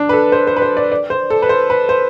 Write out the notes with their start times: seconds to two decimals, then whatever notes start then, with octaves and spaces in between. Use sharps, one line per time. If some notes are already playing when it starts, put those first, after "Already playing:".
Already playing: D4
0.09 B4
0.13 A4
0.32 C5
0.47 C5
0.57 B4
0.62 C5
0.77 D5
0.92 D5
1.10 C5
1.30 A4
1.42 B4
1.49 C5
1.70 B4
1.89 C5